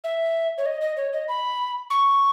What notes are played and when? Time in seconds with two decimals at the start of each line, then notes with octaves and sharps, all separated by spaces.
0.04 E5
0.58 C#5
0.66 D#5
0.81 D#5
0.97 C#5
1.13 D#5
1.28 B5
1.90 C#6